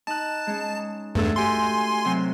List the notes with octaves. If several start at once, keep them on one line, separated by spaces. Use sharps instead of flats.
D#4 A5 F#6
G#3 C#4
E2 G2 A3 A4
F#4 G4 G#5 C6
C3 F#3 C4